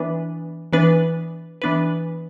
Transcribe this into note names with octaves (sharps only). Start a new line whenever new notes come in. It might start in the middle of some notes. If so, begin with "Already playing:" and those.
Already playing: E3 B3 D4 B4
E3 B3 D4 B4
E3 B3 D4 B4